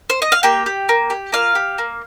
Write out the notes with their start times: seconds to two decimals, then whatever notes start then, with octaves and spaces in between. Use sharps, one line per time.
0.10 C5
0.22 D#5
0.32 F5
0.43 A#3 G4 G5
0.66 G4
0.89 A#3
1.10 G4
1.32 A#3 F4 F5
1.55 G4
1.78 A#3